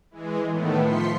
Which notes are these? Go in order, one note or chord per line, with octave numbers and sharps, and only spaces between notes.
E3 G#3
A2 D#3 A3 B3
F3 C6 B6 C#7